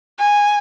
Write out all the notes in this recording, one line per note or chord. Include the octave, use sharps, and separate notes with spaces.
G#5